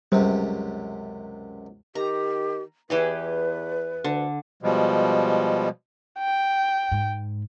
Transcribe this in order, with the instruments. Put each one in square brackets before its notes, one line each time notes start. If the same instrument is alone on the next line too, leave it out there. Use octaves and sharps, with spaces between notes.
[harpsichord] C#2 F#2 C3 [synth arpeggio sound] G3 C5
[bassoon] D#3 [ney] G4 [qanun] A#5
[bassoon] E2 [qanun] E3 G4 G#4 [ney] B4
[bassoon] D2 [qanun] D3
[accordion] B2 F3 G3 G#3
[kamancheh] G5
[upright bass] G#2